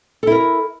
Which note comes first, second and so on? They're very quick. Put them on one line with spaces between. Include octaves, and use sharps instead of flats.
A4 E4 A#4